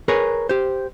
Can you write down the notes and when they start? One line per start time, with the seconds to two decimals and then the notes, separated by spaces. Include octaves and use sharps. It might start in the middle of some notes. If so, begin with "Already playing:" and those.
0.08 G#4 A#4 B4 C#5
0.49 G4 C5